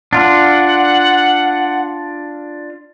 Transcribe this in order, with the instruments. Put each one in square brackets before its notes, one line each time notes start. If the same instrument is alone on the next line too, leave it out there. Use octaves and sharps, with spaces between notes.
[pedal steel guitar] D4 F4 [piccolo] F#5